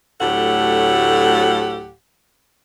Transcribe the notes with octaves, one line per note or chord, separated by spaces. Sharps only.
D2 A2 F#3 G4 A4 F#5